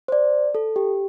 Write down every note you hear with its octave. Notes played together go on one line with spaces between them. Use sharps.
C5
D5
A4
G4